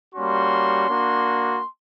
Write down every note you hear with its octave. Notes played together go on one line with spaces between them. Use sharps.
G3 A#3 C#4 F#4 C6
A#3 D4 F#4